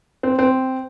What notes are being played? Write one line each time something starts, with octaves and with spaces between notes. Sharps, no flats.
C4
C4